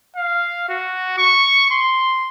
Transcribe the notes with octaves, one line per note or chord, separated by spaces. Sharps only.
F5
F#4
C#6
C6